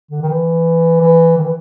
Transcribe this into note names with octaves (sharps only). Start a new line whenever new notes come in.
D3
D#3
E3
E3
D#3
E3